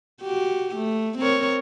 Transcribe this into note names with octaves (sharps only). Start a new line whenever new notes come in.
F#4 G4
A3
C4 A#4 C#5